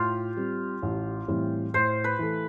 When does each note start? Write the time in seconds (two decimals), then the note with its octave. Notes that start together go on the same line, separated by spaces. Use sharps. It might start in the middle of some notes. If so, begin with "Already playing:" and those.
Already playing: A2 F4 G4
0.37 G3 C4
0.83 A1
1.28 A2 E3 G3 C4
1.74 A2 C5
2.04 B4
2.19 E3 A3